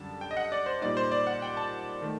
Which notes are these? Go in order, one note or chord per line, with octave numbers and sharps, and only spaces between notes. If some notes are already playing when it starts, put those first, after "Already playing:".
Already playing: F#2 D3 G3 D4 A5
G5
D#5
F#5
D5
C5
A#2 G3 A#3 D#4 D5
C5
D5
F#5
G5
A5
D#3 A3